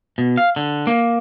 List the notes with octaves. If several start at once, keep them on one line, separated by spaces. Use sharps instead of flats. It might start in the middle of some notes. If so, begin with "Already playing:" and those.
B2
F5
D3
A#3